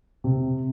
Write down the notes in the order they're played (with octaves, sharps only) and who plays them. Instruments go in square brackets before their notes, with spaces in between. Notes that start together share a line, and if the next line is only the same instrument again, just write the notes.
[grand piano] C3